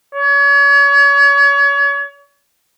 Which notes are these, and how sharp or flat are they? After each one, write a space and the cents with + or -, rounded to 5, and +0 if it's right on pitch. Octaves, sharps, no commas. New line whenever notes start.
C#5 +35